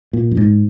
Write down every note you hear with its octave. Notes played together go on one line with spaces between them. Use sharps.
A#2
F#2
G#2